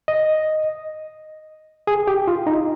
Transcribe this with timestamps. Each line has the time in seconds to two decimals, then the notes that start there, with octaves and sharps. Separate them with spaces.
0.08 D#5
1.87 G#4
2.07 G4
2.27 F4
2.47 D#4